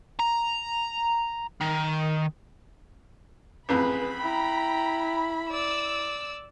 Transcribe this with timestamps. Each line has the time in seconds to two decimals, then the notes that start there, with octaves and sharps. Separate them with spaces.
0.19 A#5
1.61 D#3
3.69 A1 F2 G#4 B4 B5
4.22 E4 G5 A#5
5.52 D5 E6